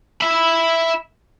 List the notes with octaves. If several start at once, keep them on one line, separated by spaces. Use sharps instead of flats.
E5 B5